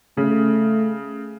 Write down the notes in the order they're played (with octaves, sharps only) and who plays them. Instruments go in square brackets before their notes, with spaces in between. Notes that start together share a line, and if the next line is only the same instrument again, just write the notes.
[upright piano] C#3 [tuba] A3